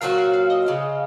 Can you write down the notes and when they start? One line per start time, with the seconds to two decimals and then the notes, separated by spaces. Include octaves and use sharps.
0.01 A#2 F#3 C4 F#4 F5
0.18 F5
0.34 F5
0.50 D#5
0.66 C#3 G#3 C4